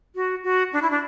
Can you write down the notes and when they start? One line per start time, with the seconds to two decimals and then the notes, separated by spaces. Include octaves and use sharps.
0.15 F#4
0.44 F#4
0.73 D4
0.82 E4
0.91 D4